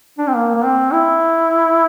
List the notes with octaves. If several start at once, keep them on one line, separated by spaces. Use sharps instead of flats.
D4
C4
A#3
A#3
C4
E4